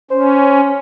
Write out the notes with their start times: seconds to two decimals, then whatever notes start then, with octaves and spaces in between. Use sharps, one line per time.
0.11 C#4 C5